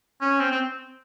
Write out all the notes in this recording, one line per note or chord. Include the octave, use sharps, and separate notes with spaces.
C#4
C4
C4